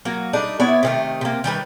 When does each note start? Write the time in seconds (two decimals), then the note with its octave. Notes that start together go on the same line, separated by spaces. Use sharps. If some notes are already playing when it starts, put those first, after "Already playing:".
0.05 F#3 A#3 F#4
0.33 G3 A3 D4 D#4
0.60 B3 E4 C#5 D5
0.83 C3 D#3 A3
1.21 C3 A#3
1.44 D#3 G3 G#4 B4